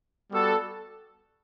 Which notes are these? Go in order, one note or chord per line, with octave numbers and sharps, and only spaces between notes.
G3 B3 F#4 A4 D5